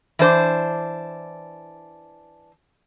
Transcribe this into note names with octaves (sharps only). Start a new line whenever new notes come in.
E3 D4 C5